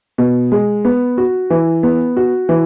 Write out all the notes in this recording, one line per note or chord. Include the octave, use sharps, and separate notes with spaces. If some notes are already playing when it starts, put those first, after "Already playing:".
B2
G#3
B3
F#4
E3
B3
F#4
E3